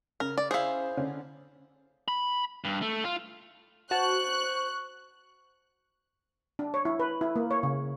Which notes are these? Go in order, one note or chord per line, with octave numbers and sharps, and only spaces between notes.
C#3 A#4
D5
E4 G#4 C5 F5
D3 C#4
B5
G2
A3
F4
F#4 C5 A5 C#6 F#6
D4
C#5
E4
B4
E4
A#3
C#5
C#3